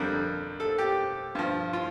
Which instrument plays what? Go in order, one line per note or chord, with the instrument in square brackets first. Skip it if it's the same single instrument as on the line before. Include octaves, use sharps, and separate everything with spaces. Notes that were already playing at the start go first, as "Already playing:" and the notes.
Already playing: [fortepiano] F2 D3 G3 A#4
A4
G4
G2 F3
F4